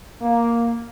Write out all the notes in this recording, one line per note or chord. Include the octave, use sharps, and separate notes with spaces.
A#3